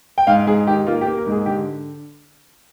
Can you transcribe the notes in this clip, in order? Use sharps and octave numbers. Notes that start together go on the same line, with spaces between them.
G5
G#2 F5
G#2 G#4
D#3 G4
A#3 F4
G4
A#3
A#4
G#2
G#4
D3 G4